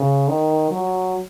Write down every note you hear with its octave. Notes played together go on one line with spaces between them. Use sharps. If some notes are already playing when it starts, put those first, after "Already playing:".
Already playing: C#3
D#3
F#3